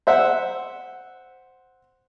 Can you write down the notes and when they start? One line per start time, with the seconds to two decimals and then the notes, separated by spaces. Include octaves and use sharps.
0.07 C5 E5 F#5